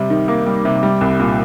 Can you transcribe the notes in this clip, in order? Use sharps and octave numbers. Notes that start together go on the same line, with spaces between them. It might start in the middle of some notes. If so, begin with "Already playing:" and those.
Already playing: C3 G3
D#3
A#3
G3
C3
G3
C2
A#2